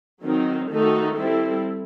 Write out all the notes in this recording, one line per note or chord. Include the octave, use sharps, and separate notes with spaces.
D#3 F#3 C4 D#4
D#3 A3 D#4 F#4 A4
G3 C4 E4 A4